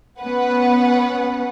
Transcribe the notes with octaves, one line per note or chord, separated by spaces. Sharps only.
B3 C#4 B4 F#5